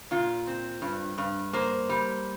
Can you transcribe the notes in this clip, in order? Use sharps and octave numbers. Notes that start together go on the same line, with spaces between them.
A#2 F4
C4
G2
G2
A#3 C5
G3